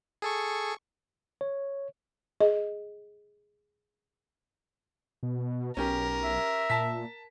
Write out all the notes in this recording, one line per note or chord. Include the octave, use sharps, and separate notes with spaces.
G#4 A4 C#6
C#5
G#4 D#5
B2
B1 C#4 G4 A#4
E5
A#2 A5 B6